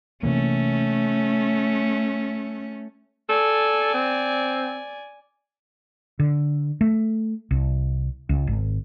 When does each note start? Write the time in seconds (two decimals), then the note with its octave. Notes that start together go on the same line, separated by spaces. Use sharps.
0.23 C3 E3 A3 A#3 C#4
3.29 A4 D5 G#5
3.94 C4
6.19 D3
6.81 A3
7.51 C2
8.29 C#2
8.47 G#1